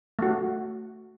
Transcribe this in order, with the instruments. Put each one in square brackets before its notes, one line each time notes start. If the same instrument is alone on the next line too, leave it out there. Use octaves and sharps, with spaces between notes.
[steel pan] A3 F#4